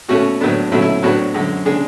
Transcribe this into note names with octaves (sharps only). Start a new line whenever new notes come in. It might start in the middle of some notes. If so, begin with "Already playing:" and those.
B2 A3 C#4 F#4
A2 F#3 B3 D4
B2 F#3 A3 C#4 E4
E4
A2 F#3 B3 D4 F#4
F#2 D3 G#3
C#3 G#3 D4 G#4